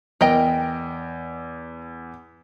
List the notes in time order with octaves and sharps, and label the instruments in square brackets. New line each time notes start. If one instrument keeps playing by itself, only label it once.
[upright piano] E2 [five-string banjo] A#4 D#5 G5